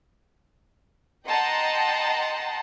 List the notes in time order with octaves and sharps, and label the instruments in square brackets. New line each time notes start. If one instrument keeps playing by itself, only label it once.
[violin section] D#5 F#5 G5 A5 A#5 C6